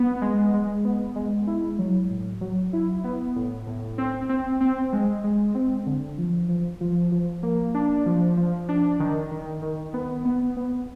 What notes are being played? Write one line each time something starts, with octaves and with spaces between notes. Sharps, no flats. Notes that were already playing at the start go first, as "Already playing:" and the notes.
Already playing: B3
G#3
G#3
B3
G#3
E4
F#3
A2
F#3
E4
B3
A2
A2
C4
C4
C4
G#3
G#3
C4
D3
F3
F3
F3
F3
A#3
D4
F3
F3
D4
D#3
D#3
D#3
B3
B3
B3